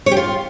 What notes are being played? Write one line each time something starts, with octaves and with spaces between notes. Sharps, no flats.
C#5
G4
F4